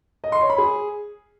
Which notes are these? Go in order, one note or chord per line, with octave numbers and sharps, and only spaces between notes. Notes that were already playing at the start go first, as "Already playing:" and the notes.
D#5
C6
C#5
B5
G#4